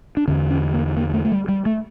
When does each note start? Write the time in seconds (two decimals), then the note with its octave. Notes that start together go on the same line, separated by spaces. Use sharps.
0.17 D4
0.28 E2 D3 C#4
0.51 C#4
0.74 A#3
0.97 A#3
1.13 A3
1.25 A3
1.32 G3
1.48 G3
1.66 A3